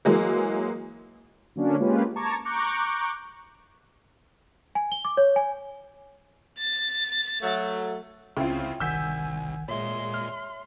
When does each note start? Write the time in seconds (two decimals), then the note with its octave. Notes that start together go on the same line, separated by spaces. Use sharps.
0.05 E3 F#3 G#3 A#3
1.56 D3 F#3 A#3 C#4 D4
1.79 G#3 A#3 C#4 F4 G4 B4
2.16 A5 A#5 C#6 D6 G#6 A6
2.45 A#5 C#6 D6 F#6 G6
4.75 G#5
4.92 G7
5.05 D6
5.17 C#5
5.36 G#5
6.58 A6
7.42 F#3 A3
8.37 C#2 C#3 C4 E4 F4 E5 G5
8.80 G1 C2 D#3 F#5 G#5 E6 G6 B6
9.68 A#2 G#3 C#5 E5 C6
10.14 F6